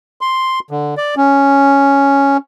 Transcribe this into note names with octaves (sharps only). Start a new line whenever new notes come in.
C6
D3
D5
C#4